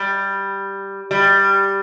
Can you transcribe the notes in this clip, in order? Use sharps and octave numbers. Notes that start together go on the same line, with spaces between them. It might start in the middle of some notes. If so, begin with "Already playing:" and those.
Already playing: G3
G3